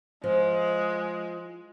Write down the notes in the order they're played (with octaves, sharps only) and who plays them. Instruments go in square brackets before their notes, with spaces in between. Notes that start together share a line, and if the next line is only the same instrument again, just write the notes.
[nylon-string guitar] F3 [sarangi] G#3